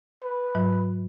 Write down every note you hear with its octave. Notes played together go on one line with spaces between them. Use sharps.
B4
G#2 F#3